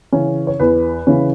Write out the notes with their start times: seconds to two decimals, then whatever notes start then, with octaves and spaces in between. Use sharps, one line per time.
0.12 C#3 E3 C#4
0.47 C#5
0.59 E2 B4
1.07 C#3 E3 C#4